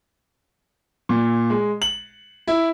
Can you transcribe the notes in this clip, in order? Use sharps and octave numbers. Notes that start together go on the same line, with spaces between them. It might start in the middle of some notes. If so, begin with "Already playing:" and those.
A#2
G#3
F#7
E4